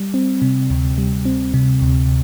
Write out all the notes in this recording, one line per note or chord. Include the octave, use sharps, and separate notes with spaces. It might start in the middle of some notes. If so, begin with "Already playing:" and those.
Already playing: G3
C4
C3
D2
G3
C4
C3
D2